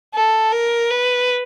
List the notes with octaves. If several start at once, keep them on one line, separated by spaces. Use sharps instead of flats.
A4
A#4
B4